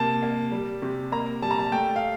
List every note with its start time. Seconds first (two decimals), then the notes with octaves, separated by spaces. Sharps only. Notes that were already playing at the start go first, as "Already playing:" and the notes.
Already playing: C3 A#3 A5
0.23 A#3
0.52 G3
0.82 C3
1.12 A#3 A#5
1.42 G3 A5
1.51 A#5
1.59 A5
1.72 A3 G5
1.96 F5